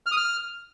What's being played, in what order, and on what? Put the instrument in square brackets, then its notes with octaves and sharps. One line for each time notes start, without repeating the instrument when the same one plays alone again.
[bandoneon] F6
D#6
F6